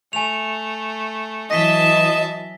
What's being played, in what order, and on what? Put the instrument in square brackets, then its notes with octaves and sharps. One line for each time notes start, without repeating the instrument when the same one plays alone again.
[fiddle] A3 [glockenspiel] G#5 F7
[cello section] E3 F#3 [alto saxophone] D#5 [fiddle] E5 A5 [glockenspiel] A#6 B6 G7